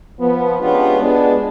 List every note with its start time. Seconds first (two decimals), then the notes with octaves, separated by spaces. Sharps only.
0.20 F3 B3
0.60 G#3 B3 C#4 D4 F4 G4
1.00 G#3 B3 D4